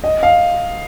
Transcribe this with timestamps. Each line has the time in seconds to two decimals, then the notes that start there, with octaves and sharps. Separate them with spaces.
0.04 D#5
0.23 F5